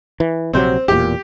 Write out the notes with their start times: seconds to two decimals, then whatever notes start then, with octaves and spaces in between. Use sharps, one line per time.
0.20 E3
0.53 A#1 C3 F#3 C4 C5
0.88 E1 E2 A#2 G4